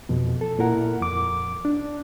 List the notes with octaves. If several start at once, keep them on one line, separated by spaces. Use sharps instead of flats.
F2 B2
A4
A#2 E4 A#4 F#5
F2 D6
D4